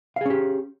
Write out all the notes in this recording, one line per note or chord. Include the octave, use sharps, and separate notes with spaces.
C#4 G4 G#4 F5